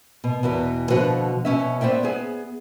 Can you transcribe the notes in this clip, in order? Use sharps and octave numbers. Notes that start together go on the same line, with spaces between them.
B2
E2 B2 B4
B2 D3 F3 F#4 B4 F#5
B2 C#4 E5
B3 C5 D5 E5 G5
B3 G#4